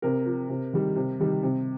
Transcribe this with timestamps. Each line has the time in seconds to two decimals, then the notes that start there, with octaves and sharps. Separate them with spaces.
0.02 C3 A#4
0.26 F3
0.49 C3
0.73 D#3 G3
0.96 C3
1.20 D#3 G3
1.43 C3